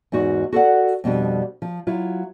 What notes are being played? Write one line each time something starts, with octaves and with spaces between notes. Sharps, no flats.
E2 G#2 D#4 F#4
F#4 A4 D5 F#5
F2 B2 G3 D4
F3
F#3 E4 F4